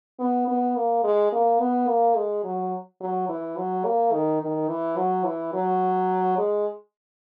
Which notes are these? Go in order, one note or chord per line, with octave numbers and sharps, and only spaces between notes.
B3
B3
A#3
G#3
A#3
B3
A#3
G#3
F#3
F#3
E3
F#3
A#3
D#3
D#3
E3
F#3
E3
F#3
G#3